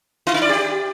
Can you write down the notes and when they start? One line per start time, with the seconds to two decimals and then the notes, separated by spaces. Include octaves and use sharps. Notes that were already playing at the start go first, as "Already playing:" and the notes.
0.27 E4
0.34 D#4
0.42 D5
0.49 G4